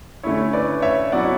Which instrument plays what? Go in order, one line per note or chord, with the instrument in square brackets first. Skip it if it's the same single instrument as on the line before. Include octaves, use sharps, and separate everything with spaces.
[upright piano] D3 A3 C#4 E4 [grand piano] C#5
[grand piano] B4 D5
C#5 E5
[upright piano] B2 F#3 C#4 E4 [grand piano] D5 F#5